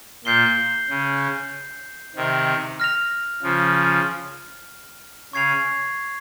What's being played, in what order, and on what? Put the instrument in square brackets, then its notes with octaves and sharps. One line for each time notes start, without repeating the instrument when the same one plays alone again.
[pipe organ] A#2 [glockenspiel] G6 C7 G7
[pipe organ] C#3
C3 D#3
[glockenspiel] F6 A#6 F7
[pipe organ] C#3 F3
[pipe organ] C#3 [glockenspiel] C#6 G#6 C7 F7